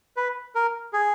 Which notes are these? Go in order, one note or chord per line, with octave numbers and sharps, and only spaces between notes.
B4
A#4
G#4